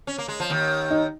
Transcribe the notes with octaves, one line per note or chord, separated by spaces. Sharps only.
C#4
A#3
G#3
F3
D#2 D#3
D#4